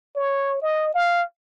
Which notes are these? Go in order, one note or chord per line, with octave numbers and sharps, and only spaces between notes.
C#5
D#5
F5